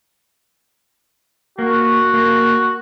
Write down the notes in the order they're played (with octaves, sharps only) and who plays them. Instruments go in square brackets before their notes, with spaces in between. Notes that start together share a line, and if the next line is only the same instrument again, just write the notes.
[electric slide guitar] A#3 [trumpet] F#4
[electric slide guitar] A#3